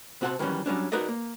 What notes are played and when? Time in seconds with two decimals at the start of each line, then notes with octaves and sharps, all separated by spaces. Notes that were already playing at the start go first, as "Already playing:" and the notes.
0.21 C3 C4 F#4 F#5 A5 C6
0.39 D#3 E3 F#3 G3 C#4
0.66 F#3 G3 C#4 D4
0.92 D#4 F#4 A#4 B4 D5 D#5
1.08 A#3